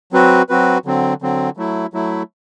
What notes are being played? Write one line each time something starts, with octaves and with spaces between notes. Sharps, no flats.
F#3 C4 F#4 B4
F#3 C4 F#4 B4
D3 F#3 C4
D3 F#3 C4
F#3 A3 E4
F#3 A3 E4